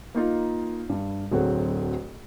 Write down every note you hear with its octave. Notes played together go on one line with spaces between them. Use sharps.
A#3 D#4 F4
G2
D1 F#3 C4 G#4 A4 F#5